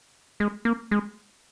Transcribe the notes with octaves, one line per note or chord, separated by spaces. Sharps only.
G#3
A#3
G#3